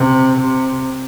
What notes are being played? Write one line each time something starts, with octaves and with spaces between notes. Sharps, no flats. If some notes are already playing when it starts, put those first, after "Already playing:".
Already playing: C3
C3